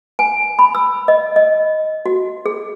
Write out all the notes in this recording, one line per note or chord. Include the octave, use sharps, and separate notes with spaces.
G#5
B5
E6
D#5
D#5
F#4
G#4